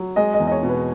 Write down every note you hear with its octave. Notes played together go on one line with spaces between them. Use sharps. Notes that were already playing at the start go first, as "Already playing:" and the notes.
Already playing: F#3
G#3 D#5
D#5
E2
D#5
C#5
B2
B4